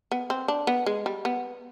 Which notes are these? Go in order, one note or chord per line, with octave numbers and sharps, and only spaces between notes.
B3
C4
D4
B3
G#3
G3
B3